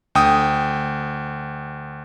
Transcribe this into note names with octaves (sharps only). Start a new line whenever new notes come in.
D2 G5 D#6